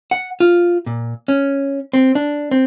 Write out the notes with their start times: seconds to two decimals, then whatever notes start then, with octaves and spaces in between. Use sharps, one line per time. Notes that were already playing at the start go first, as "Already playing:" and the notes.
0.11 F#5
0.40 F4
0.86 A#2
1.28 C#4
1.93 C4
2.15 D4
2.51 C4